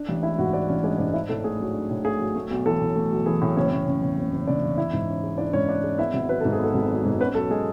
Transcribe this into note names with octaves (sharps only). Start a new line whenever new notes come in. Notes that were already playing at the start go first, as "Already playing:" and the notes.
Already playing: D4
A1
G#3 E4 E5
G#2 F#4 F#5
D4 D5
A1 C#4 C#5
G#3 D4 D5
G#2 D4 D5
D4 E4 E5
A2 A4
A3 G#4
F#3
D4
A2
A3 G#4
F#3
A3
B1
E3 A4
A2
A3
B1
E3 G#4
A2
F#1 C#4 C#5
F#1
C#3
E2
F#1
F#1
C#3 D4 D5
E2
E4 E5
G#2
C#4
G#3
D4 E4 D5
G#2 C#4 C#5
C#4 D4 D5
G#3
B3 E4 E5
G#1
F#3 B4
G#2 A4
G#4
B3
A4
G#1
F#3
G#2
B3 C#4 B4
B1 A4
G#3 G#4